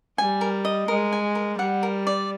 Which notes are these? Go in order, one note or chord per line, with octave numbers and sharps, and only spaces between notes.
G3 G#5
A#4
D#5
G#3 A#4
G#5
A#4
G3 F#5
A#4
D5